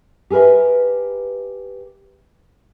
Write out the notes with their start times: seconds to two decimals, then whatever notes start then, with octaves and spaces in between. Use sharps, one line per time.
0.30 G4 G#4 A#4 B4 E5